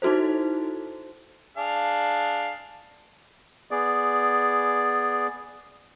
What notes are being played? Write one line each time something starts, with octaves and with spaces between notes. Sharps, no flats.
D#4 E4 F#4 A4 C5
D4 G#4 F5
B3 G#4 D5